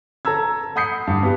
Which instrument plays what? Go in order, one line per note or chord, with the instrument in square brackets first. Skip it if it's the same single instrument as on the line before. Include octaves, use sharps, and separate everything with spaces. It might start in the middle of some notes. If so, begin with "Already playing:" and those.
[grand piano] A4 A5 A#5 E6 G#6
F#5 B5 D#6 G6 C7 C#7
G2
B3 G4